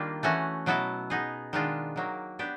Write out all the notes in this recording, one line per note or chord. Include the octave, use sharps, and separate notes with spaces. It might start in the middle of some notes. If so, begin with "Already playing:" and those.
Already playing: D#3 G3 A#3 D4 F4
E3 A3 C#4 F#4
B2 F#3 B3 E4 A4
B3 D#4 G#4
D#3 G#3 B3 D4 F4
D#3 F#3 A#3
B3 D4 G4